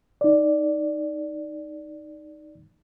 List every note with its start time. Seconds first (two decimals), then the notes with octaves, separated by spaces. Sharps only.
0.21 D#4 D5